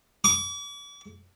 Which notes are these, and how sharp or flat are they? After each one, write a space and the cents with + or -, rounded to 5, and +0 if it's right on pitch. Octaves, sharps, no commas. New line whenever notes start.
D6 -45